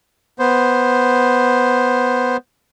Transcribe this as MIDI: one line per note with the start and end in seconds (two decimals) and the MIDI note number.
0.39 2.37 59
0.39 2.37 72